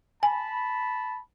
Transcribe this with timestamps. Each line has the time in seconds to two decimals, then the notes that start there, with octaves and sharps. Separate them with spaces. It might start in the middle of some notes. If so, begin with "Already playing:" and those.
0.23 G#5 A5 B5